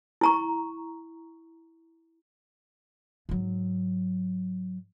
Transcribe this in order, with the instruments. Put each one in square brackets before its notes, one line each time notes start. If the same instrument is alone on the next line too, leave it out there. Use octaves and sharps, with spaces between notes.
[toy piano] E4 A#5 C#6
[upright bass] G#2 F#3